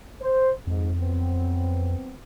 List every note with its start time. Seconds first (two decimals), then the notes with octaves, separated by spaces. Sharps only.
0.22 C5
0.67 F2 G#2
0.98 F#3 B3 C4